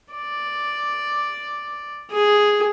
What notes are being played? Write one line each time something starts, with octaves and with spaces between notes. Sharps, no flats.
D5
G#4